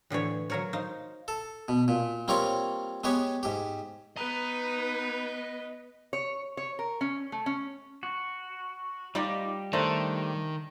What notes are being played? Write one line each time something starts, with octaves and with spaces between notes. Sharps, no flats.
A2 D3 E3 C#5
F#3 A#4 C#5
D#4 C5 F5
A4
B2
A#2
G3 A#3 C4 F4 A#4 C#5
G#3 B3 G4 C#5
G#2 G4
B3 B4 D#5 A#5
C#5
C#5
A#4
C#4
A3
C#4
F#4
G3 D#4 F4 G4 D5
D#3 A3 D4 C5 A#5